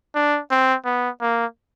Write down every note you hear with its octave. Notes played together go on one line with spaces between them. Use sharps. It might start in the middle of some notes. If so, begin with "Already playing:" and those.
D4
C4
B3
A#3